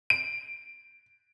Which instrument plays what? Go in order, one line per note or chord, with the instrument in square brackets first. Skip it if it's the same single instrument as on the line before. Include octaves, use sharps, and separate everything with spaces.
[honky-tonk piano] D7